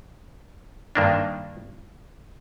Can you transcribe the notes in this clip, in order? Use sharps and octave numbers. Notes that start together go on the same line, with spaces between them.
G2 D#3 A#3 D4